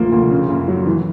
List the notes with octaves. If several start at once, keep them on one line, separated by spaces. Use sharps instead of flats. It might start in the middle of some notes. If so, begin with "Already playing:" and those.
Already playing: D2 F3 A3 A#3
D2 A#3
C#3
F#2
F#3
E3